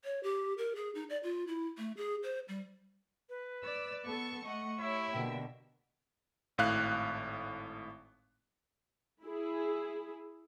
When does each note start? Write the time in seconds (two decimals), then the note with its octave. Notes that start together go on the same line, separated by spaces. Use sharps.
0.04 C#5
0.23 G4
0.58 A#4
0.75 G#4
0.95 D#4
1.10 D5
1.23 F4
1.47 E4
1.78 A3
1.97 G#4
2.23 C5
2.48 G3
3.29 B4
3.63 D5 E6
4.06 B3 A4 A5 C#6
4.45 A3 D#5 F#5 C#6
4.80 E4 G4 C#5 E5
5.13 B2 D3 A#3 G5
6.58 G#1 A2 F5 F#6
9.24 E4 G#4